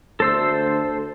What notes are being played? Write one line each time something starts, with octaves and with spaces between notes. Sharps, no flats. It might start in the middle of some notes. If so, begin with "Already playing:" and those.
D2 A4 C5 E6